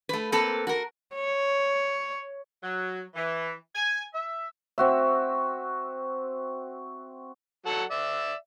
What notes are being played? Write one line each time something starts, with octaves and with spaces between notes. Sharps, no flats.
A3 B4
A#3 C4 A4 B4
F#4 A#4
C#5
F#3
E3
G#5
E5
C4 F#4 E5
F#3 A4 F#5
D5 E5